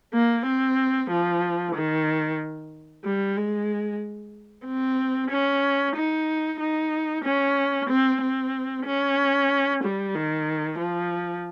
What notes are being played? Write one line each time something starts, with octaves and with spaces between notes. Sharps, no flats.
A#3
C4
F3
D#3
G3
G#3
C4
C#4
D#4
D#4
C#4
C4
C4
C#4
G3
D#3
F3